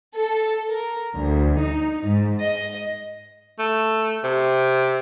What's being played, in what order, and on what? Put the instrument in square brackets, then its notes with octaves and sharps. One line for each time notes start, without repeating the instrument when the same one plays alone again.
[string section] A4
A#4
D2
D#4
G#2
D#5
[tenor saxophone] A3
C3